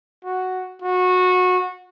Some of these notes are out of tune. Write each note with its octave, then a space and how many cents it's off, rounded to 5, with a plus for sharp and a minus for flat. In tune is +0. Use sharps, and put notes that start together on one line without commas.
F#4 +0
F#4 -20